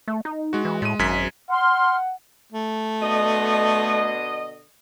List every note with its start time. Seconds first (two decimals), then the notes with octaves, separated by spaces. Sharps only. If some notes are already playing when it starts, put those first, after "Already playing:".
0.08 A3
0.25 D#4
0.53 G#3 F#4
0.65 E3
0.82 A2 G#3 D#7
0.99 G#1 F#2 G#6 B6
1.50 F#5 C6 F6
2.52 A3
3.02 B2 D3 D#5